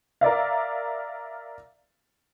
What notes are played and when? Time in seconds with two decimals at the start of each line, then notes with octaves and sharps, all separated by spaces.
0.21 A#4 D5 E5 F5